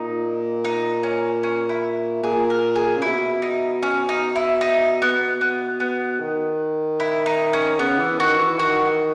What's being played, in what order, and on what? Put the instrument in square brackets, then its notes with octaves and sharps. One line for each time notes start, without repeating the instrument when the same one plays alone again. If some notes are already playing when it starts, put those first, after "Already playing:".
Already playing: [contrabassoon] A#2 [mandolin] D#4
[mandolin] D#4
C#4
C#4
E4
[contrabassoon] A#2 [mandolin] G#4
[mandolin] A#4
G#4
[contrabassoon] C#3
[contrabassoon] B2 [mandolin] E4
[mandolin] D#4
C#4
D#4
E4
D#4
B3
B3
B3
[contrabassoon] D#3
[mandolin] E4
D#4
C#4
[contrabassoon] C#3 [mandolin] B3
[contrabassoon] E3
[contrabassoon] D#3 [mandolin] F#4
[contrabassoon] E3
[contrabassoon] D#3 [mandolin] F#4